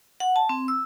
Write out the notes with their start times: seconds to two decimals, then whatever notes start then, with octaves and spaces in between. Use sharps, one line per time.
0.20 F#5
0.36 A5
0.49 C4
0.68 E6